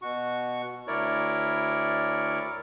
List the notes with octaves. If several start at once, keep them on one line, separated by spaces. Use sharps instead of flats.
B2 F#4 C#6
D2 E4 A#4 C#5 D5